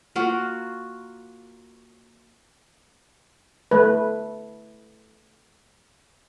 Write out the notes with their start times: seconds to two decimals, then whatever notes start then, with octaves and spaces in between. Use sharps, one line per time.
0.16 A#3 F4 F#4
3.71 A3 B4